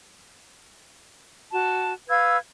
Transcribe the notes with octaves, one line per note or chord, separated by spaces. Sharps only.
F#4 A5
B4 F5 E6 G#6